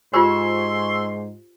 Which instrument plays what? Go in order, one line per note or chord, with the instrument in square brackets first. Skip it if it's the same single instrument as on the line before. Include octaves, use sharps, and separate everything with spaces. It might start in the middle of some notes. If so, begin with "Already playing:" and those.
[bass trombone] G#2 [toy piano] F4 G4 C5 [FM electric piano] G#5 C#6 E6 [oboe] C6